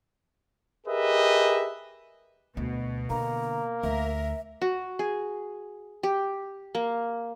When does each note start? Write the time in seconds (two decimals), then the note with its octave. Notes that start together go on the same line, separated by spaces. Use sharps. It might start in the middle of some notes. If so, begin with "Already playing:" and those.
0.87 G4 G#4 A#4 B4 D#5 E5
2.57 D2 B2
3.10 D3 A#3 A#5
3.83 D2 A#4 E5
4.62 F#4
4.99 G#4
6.03 G4
6.75 A#3